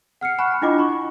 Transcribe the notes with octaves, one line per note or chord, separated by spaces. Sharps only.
F#5 F6 C7 C#7
F#5 G#5 B5 C#6 F6 F#6
D4 E4 F4 D#5 G#5 D6
B5 C#6